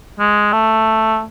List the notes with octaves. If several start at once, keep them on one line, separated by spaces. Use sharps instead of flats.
G#3
A3